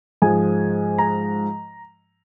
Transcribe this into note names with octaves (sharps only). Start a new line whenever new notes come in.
G#2 F3 G#3 G#5
A#5